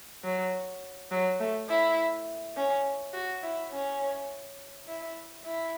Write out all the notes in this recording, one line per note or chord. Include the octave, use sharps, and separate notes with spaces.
F#3
F#3
A3
E4
C#4
F#4
E4
C#4
E4
E4